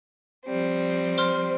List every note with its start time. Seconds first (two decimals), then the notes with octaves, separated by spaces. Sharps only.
0.45 F3 G3 C4
1.18 C5 C6 F6